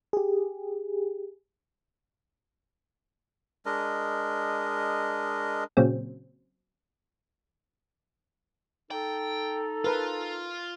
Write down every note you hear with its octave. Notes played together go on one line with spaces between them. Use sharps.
G4 G#4
G#3 D4 A#4 D#5
A#2 C#3 F#3 C4
D#4 A4 G5
F4 A#4 B4 A5